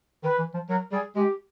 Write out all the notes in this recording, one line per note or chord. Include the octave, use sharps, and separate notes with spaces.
D#3 B4
E3
F3
F#3 A#4
G3 G#4
G#3 G4